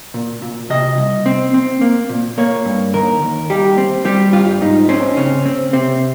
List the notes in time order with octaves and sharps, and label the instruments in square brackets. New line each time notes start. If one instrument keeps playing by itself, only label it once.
[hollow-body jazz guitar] A#2
A#2
C3 D#5
C2
C4
C4
A#3
A#2
A#3 C#5
G2
D#2 A#4
D#2
G3 G4
C4
G3 G4
G2 F4
G#2 D#4
C4 C#4
C#3 C#4
C4
C3 C4